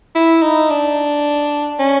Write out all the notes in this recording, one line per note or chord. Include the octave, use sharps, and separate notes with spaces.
E4
D#4
D4
C#4